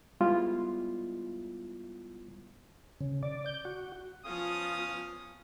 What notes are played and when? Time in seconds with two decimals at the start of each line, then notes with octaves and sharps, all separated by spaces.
0.20 G3 G#3 B3 E4 F4
3.01 C#3
3.23 D5
3.46 G6
3.65 F#4
4.26 F3 B3 C#4 F5 D#6